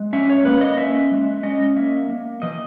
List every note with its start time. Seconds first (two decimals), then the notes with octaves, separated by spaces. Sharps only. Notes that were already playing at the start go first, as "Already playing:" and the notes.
Already playing: G#3
0.13 C#4 E5
0.30 C#5
0.45 A#3 B4
0.61 D#5
0.78 C#4 E5
1.12 G#3
1.43 C#4 D#5
1.77 A#3 E5
2.10 A#3
2.42 E3 D#5